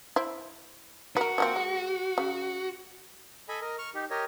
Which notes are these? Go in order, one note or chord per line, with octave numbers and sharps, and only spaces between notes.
E4 C5
F#4 A#4 B4
F3 A#3 C4
G#3
C#3
A4 D#5 G#5 B5
A#4 D#5
C#6 F6
D#4 G4
G4 A#4 C#5 D#5